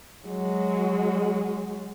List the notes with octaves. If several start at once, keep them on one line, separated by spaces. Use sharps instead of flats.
F#3 G#3